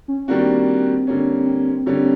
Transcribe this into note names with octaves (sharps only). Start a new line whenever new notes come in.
C#4
D#3 G3 A#3 C4 D4 F#4
D3 G3 A#3 C#4
D3 G3 A#3 C#4